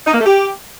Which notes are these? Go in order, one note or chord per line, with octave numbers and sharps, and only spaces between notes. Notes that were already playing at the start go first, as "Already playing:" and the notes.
D#4
A#3
A3
G4